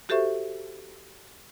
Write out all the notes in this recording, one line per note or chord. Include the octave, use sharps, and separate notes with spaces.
F#4 G4 A4 C5 E5 C#6